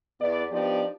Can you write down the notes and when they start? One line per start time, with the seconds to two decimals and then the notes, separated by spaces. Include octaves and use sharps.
0.21 E2 B3 E4 D5
0.51 F3 B3 D4 D#4 G4 D5